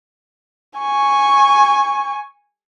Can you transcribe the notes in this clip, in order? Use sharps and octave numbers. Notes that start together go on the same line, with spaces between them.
G#5 C#6